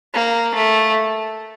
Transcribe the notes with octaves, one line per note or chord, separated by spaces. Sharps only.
A#3
A3